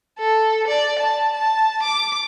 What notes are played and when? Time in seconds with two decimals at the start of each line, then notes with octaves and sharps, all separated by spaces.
0.19 A4
0.68 D5
0.99 A5
1.33 A5
1.83 D6